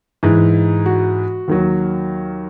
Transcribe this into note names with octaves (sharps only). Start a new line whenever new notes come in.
G#2 E3
F#4
D#2 D#3 F#3